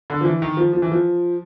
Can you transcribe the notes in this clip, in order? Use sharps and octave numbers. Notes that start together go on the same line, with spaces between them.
D3
F3
E3
D#3
F3
F3
E3
F3